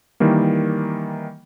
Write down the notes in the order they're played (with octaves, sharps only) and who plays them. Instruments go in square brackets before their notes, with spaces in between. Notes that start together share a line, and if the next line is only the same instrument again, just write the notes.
[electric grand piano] D#3 E3 G3 A#3